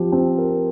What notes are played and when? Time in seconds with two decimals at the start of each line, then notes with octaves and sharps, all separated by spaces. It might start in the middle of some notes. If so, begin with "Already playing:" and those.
Already playing: F3 C4 G4
0.12 C4
0.38 A#4